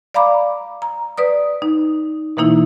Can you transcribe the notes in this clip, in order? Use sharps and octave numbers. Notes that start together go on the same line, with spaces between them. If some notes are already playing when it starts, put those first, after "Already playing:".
D5 F5 A#5 B5 D6
A#5
B4 D5 D#6
D#4
B2 E3 A#3 D#4 E4